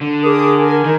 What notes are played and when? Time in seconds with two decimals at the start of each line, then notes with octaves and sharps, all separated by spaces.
0.01 D3
0.23 G#4 A#4 D6 D#6
0.57 G#5
0.85 D#3